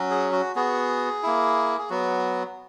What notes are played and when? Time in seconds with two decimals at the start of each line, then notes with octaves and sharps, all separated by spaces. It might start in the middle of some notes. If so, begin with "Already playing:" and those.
Already playing: F#3 C#4 F#4
0.11 G#4
0.32 F#4
0.55 B3 F#4 G#4
1.23 A#3 E4
1.78 G#4
1.90 F#3 B3 F#4